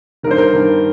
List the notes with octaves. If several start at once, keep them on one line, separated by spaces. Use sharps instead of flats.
G2 D#3 A#4 C5
A#4
G2 D#3